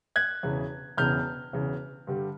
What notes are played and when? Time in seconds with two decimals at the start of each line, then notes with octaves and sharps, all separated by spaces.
0.16 F#6 G#6
0.43 E1 E2 C#3
0.97 E1 E2 C#3 F6 G6
1.53 E1 E2 C#3
2.07 G2 D3 G3